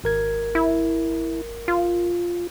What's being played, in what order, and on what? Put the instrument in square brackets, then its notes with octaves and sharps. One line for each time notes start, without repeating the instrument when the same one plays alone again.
[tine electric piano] G#1 A#4 G#6
[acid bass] E4
F4